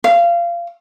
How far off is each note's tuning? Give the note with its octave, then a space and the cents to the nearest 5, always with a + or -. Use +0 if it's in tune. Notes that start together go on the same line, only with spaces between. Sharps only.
F5 -25